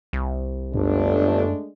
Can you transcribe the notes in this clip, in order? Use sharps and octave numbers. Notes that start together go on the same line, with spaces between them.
C2
G1 F#2 G#3 A3 D4